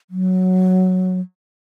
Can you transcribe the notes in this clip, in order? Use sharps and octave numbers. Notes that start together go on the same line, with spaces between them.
F#3